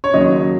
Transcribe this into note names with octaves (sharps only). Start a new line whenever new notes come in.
C#5
D#2 C#3 F#3 D#5